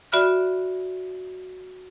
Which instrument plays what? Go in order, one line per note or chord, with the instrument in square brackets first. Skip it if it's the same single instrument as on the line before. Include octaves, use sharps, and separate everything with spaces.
[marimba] F#4 D5 E5 B5 F6 F#6